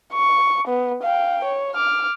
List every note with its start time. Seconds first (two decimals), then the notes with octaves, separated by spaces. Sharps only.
0.14 C#6
0.68 B3
1.03 F5 G5
1.44 C#5
1.74 D6 F6